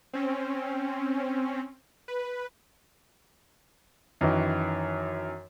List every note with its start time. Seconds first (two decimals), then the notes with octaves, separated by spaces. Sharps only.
0.13 C4 C#4
2.08 B4
4.21 F#2 D#3 E3